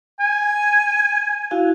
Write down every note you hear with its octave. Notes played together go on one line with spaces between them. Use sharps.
G#5
E4 F#4 F5